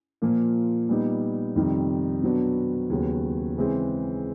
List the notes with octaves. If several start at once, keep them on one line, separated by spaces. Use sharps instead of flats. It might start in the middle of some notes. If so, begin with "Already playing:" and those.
A#2 F3 A#3
A#2 G3 B3 D#4
F2 C3 D#3 G3
B2 F#3 B3 D4
D#2 C#3 F#3 B3
C#3 E3 G#3 C4